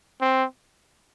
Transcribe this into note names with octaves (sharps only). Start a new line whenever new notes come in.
C4